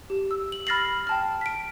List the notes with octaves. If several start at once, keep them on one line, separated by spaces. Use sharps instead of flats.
G4
E6
F#7
B5 F6 A6 A#6 C7 F#7
G5 A5 F6
B6 D7